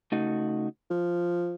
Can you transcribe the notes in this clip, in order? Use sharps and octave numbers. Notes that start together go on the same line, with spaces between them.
C#3 A3 D#4 F#4
F3